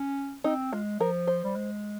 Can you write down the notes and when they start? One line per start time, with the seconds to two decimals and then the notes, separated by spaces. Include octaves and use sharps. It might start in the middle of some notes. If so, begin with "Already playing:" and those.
Already playing: C#4
0.44 C4 D#4
0.73 G#3 F4
1.00 F3 A#4
1.27 C5
1.44 G3
1.56 G#3